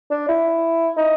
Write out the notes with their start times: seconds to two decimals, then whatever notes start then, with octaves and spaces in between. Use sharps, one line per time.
0.11 D4
0.28 E4
0.97 D#4